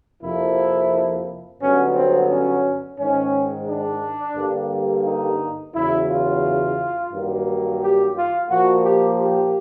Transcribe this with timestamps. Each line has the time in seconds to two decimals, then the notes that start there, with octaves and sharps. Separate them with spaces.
0.21 F2 C3 F3 A#3 E4
1.60 G2 D3 F#3 B3 C#4
1.93 C4
2.28 C#4
2.97 G#2 D#3 G#3 C#4
3.65 D4
4.34 G2 D3 G3 A#3
5.04 D#4
5.72 E2 C#3 F#3 E4
6.07 F4
7.10 G2 D#3 F#3 A#3
7.79 G4
8.14 F4
8.48 A#2 F3 A#3 F#4
8.82 G4
9.17 G4